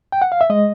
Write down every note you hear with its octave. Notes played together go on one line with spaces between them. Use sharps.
G5
F#5
F5
E5
G#3 D#5